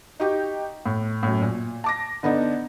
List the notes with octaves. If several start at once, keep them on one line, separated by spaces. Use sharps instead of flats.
D#4 F#4 G4 G5
A2
F#2 A2
A#2
A5 D6 A#6
D3 B3 D4 D#4